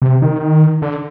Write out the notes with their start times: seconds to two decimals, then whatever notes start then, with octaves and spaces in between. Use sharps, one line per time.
0.02 C3
0.22 D#3
0.82 D3